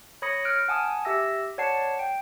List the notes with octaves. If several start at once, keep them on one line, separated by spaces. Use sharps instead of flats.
C#5 B5 D#6 A#6 C#7
F6 F#6 D7
F#5 G#5 A5 D#6
G4 E5 E6 A#6
C#5 D5 F#5 A5 C7 C#7
G5